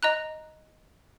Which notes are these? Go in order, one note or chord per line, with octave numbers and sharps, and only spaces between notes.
D#5 A#5 F#6